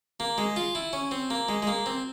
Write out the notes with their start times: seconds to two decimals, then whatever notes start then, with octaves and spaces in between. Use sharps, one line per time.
0.20 A#3
0.38 G#3
0.56 F4
0.75 E4
0.93 C#4
1.11 C4
1.30 A#3
1.49 G#3
1.62 G#3
1.67 A#3
1.86 C4